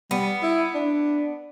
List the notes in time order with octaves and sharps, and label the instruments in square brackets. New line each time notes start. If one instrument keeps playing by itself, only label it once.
[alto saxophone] G3 [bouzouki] B3
[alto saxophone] E4
D4